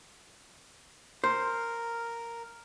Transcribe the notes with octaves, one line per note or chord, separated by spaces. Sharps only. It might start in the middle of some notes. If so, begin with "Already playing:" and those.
A#4 C5